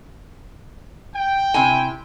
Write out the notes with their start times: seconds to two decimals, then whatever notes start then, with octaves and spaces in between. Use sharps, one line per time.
1.16 G5
1.54 C3 E4 G#5